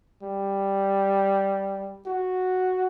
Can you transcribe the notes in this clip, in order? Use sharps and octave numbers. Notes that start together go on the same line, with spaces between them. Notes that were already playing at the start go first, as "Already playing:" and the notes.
G3
F#4